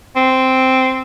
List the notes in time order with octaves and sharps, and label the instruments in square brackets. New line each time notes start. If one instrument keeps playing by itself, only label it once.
[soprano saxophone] C4